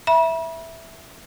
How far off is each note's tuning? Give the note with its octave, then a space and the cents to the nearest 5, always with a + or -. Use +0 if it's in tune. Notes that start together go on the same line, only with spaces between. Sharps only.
E5 +0 B5 -40